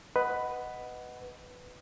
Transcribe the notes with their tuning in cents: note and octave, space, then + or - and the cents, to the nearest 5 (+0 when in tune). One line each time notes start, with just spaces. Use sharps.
B4 +5 D#5 +0 F#5 +0